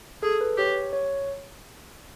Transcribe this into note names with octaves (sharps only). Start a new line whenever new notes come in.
G#4 A4
B4
G4 C#5
C#5